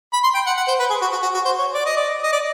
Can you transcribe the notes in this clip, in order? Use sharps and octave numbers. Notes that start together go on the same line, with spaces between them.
B5
C6
G5
F#5
F#5
C5
B4
G#4
F#4
F#4
F#4
F#4
C5
C#5
D5
D#5
D5
D#5
D5